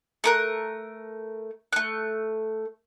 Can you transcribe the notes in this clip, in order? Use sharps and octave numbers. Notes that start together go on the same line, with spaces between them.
A3 A#4 F#6
A3 F#6